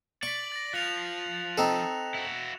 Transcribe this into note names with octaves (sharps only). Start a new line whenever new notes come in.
D5 C#6 B6 F#7
A6 A#6
F3 F#6 C#7 F7
C4 D#4 A4 E7
E4 F#4